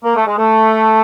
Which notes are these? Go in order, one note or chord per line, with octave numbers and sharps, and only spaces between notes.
A#3
A3
G#3
A3